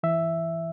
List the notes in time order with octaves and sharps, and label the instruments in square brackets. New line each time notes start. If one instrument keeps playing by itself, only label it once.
[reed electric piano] E3 E5